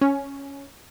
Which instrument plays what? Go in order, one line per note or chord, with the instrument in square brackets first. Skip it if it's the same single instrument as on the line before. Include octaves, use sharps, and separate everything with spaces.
[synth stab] C#4